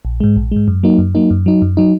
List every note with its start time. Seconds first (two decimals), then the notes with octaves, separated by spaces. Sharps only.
0.05 A#1
0.20 G#2 G#3
0.36 A#1
0.52 G#2 G#3
0.68 F#2
0.83 F#3 A#3 D#4
0.98 F#2
1.15 F#3 A#3 D#4
1.31 F#2
1.46 F#3 D#4
1.62 F#2
1.77 F#3 D#4